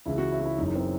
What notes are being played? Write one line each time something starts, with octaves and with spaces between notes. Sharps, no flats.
C#2 C#3 E3 E4
F#4
E4
F#4
E4
F#1 F#2 E3 D#4
C4